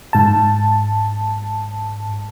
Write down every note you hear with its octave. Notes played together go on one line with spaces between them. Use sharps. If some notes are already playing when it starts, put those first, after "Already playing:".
G#2 A5